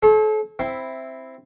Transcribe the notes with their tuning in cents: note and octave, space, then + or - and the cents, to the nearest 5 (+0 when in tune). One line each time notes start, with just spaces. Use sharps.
A4 -35 C#5 -45
C4 +0 E4 +0